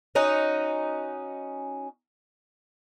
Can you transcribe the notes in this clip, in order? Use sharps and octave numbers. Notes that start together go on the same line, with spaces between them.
C#4 D#4 F#4